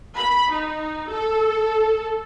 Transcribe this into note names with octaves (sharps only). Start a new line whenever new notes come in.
B5
D#4
A4